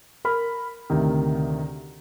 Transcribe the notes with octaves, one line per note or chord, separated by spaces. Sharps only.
A#4 B5 F6
D2 C3 D#3